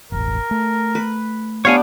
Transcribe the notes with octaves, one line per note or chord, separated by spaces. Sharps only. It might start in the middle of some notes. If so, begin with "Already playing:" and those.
E1 A1 A#4
A3
B4
B3 D4 G4 C#5 F5 G#5